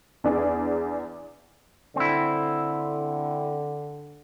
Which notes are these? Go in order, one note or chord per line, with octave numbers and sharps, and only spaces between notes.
E2 D4 G#4
D3 C4 E4